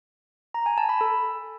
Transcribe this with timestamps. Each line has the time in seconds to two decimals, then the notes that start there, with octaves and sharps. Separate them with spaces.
0.54 A#5
0.66 G#5
0.78 A5
0.89 B5
1.01 A4